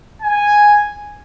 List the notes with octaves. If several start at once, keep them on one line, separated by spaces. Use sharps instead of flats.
G#5